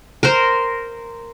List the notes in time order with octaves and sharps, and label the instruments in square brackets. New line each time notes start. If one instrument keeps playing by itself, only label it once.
[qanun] A#4 C5